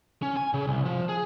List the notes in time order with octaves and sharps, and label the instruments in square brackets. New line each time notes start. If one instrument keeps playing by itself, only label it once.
[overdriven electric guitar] C#4
G#5
C#3
C2
F3
G#4